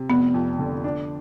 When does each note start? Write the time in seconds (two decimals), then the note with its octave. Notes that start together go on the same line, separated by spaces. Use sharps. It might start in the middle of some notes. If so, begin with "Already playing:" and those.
Already playing: C3
0.10 F1 B3
0.34 F2
0.59 D3
0.84 D4